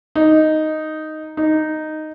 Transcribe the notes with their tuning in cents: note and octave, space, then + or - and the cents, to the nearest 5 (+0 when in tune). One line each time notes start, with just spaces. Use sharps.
D#4 +0
D#4 -5